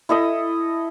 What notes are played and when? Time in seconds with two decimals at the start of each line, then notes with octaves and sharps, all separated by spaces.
0.09 E4 A4 D#5 D#6